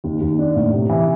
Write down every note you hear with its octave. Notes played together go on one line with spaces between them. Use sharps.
D#2
D#2
D4
A2
C3
E3